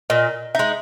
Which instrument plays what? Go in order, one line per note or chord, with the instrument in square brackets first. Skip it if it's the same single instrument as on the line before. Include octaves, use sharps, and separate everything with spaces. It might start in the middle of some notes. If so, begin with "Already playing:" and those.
[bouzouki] A#2 [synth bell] D#5
[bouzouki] G#3 D#4 [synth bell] E5